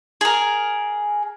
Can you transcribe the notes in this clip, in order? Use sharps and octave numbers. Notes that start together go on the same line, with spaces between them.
G#4 A#4